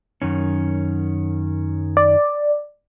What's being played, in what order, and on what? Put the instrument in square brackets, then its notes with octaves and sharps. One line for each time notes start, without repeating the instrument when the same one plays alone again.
[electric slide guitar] F#2 D#3 C#4
[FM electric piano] D5